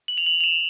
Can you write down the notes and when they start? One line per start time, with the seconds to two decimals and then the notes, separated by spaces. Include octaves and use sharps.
0.08 F#7
0.18 F7
0.26 F#7
0.41 F7
0.44 E7